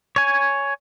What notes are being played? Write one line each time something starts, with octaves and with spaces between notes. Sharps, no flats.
C#5 G#5